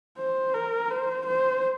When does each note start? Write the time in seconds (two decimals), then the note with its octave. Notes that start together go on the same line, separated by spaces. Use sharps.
0.18 C5
0.54 A#4
0.91 C5
1.26 C5